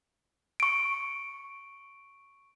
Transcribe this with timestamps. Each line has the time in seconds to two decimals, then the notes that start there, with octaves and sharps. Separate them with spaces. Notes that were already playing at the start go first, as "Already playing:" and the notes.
0.60 C#6 D7